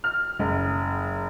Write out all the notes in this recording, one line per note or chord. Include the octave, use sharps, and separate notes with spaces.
F6
F#1